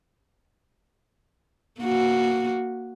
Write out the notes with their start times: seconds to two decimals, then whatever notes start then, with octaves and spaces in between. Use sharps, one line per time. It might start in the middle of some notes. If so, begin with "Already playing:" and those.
1.80 A#3 F#4